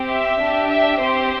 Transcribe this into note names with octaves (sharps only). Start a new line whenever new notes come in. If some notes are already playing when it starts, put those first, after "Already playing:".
Already playing: C4 G4
E5
D4 G4
E5
C4 G4 C5